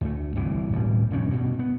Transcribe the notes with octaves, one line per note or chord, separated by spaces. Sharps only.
D2 A3
G1 C2 A#2 E3
D1 B2 F#3 G3
F1 G2 D#3 C#4
G2 B2
B3